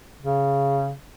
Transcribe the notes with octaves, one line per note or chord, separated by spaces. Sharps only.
C#3